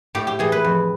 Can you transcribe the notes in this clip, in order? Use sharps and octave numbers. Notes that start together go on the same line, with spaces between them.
A2 G4
G4
E3 G#4
B4
F2